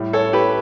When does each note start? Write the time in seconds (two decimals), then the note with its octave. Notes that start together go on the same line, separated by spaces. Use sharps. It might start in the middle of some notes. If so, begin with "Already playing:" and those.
Already playing: A2 G3
0.13 A4 C#5
0.33 G4 B4